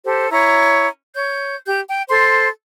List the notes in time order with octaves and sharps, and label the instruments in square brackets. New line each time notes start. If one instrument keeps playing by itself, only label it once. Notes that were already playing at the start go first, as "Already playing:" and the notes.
[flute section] G4 A4 C5
E4 C#5 A#5
C#5 G6
G4 G6
G5
A4 C5 C6